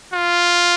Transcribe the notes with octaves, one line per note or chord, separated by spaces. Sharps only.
F4